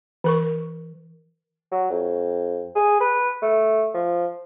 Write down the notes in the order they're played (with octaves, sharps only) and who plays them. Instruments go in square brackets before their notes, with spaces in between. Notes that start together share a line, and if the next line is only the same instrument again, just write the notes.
[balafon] E3 A#4 C#6
[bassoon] F#3
F2
G#4
B4
A3
F3